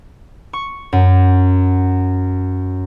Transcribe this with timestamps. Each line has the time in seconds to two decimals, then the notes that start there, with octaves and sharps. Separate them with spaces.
0.53 C#6
0.93 F#2